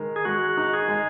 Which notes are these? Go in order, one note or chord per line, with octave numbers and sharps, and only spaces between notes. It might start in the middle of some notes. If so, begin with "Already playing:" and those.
Already playing: D#3 G#3 A#4
G#4
G#3 F#4
D#4
G#4
G#3